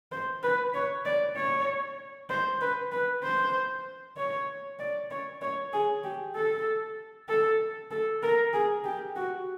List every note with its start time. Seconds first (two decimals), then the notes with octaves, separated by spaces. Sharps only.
0.12 C5
0.43 B4
0.74 C#5
1.05 D5
1.37 C#5
2.30 C5
2.61 B4
2.92 B4
3.23 C5
4.17 C#5
4.79 D5
5.11 C#5
5.42 C#5
5.73 G#4
6.04 G4
6.35 A4
7.29 A4
7.91 A4
8.23 A#4
8.53 G#4
8.85 G4
9.16 F#4